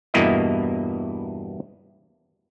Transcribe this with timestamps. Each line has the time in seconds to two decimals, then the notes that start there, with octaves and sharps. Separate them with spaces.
0.14 E2 G2 B2 A#3 E4 D#5